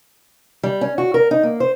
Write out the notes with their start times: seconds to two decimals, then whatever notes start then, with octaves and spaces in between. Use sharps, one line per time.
0.63 G3
0.81 C#4
0.98 F#4
1.14 A#4
1.31 D#4
1.43 A#3
1.60 C5